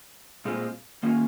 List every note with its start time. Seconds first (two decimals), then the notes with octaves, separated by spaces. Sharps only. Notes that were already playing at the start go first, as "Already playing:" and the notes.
0.45 A#2 G#3 C4 F4
1.03 D#3 A#3 C#4 F4